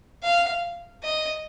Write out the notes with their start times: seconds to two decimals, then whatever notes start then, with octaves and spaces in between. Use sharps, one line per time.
0.23 F5
1.03 D#5